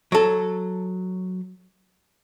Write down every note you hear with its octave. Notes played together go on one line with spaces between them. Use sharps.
F#3 A4